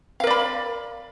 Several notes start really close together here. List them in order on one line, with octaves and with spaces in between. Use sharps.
F5 A#4 D5 B5